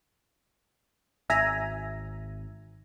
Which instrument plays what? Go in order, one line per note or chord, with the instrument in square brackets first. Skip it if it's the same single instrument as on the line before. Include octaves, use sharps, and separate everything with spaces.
[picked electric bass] G#1 [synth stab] E5 G#5 A#5